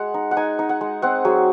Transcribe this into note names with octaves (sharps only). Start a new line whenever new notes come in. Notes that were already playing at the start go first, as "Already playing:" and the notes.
Already playing: G#3 F#5
D#4
F#5
D#4 G#5
D#4
F#5
G#3
C4 F#5
F#3 G#4